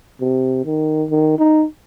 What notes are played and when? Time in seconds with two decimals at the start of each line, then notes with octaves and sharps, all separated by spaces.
0.21 C3
0.65 D#3
1.10 D#3
1.39 D#4